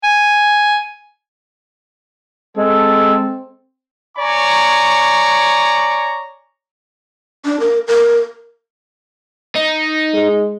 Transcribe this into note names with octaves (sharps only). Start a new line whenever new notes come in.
G#5
G#3 C4 A4
C#5 D5 G#5 A#5 C#6
D4
A#4
A#4
D#4
G#3